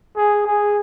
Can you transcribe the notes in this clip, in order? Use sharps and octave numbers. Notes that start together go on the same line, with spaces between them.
G#4
G#4